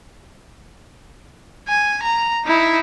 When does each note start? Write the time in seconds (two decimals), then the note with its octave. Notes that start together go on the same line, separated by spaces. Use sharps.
1.68 G#5
2.02 A#5
2.46 D#4 E4